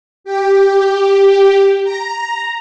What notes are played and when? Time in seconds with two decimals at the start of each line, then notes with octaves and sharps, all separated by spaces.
0.24 G4
1.84 A#5